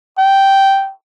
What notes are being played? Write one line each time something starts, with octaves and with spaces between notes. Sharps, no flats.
G5